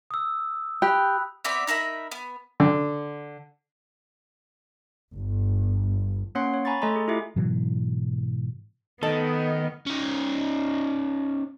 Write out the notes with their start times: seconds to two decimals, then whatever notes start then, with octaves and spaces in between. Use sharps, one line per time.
0.11 D#6 E6
0.82 G4 G5 B5 F#6
1.45 B3 C4 D5 E5
1.67 D#4 A#4 E5 B5
2.11 B3
2.60 D3
5.14 G1
6.35 A#3 C#4 C#5 F#5 C6 C7
6.54 C#5
6.65 G#5 A#5 B5 C#6 A6
6.82 A3 A4 D#5 G#5 A#5 C6
6.96 G#4
7.08 E4 F4 G4 E5
7.36 G#2 B2 E3 F#3
9.03 D#3 B3 A4 D#5
9.87 C#4 D#4